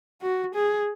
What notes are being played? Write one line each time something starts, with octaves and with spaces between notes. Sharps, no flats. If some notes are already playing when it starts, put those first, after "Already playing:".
F#4
G#4